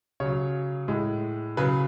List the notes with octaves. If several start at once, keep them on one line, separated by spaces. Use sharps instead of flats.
C#3 F#3 C#5
A2 G#3
C#3 F#3 B4